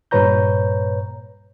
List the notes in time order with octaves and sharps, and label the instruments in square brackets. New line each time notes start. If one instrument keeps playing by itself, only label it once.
[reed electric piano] G2 A#2 B4 C#5 A#5 G6